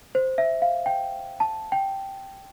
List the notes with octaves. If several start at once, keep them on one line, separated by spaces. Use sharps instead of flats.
C5
E5
F5
G5
A5
G5